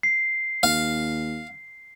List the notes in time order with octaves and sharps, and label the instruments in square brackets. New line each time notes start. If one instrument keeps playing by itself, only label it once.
[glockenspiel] C7
[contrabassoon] D#2 [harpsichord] F5